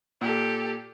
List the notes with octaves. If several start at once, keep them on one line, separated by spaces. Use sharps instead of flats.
A#2 G4 A4